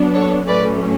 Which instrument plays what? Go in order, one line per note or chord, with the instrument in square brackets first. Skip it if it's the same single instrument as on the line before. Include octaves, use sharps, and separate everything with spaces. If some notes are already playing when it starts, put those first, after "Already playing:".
Already playing: [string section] F#3 B3 D4
A4 C#5
A2 F#3 A3 C#4 B4 D5